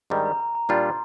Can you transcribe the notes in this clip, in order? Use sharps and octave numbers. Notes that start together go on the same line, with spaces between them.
G#2 D#3 G3 D4 A#5
A#5
A#5
A#5
A#2 G3 D4 F4
C6